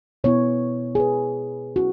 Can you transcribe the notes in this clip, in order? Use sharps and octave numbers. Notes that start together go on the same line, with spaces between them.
B2 B3 E4 C#5
G#4
B4
C#4 E4 F#4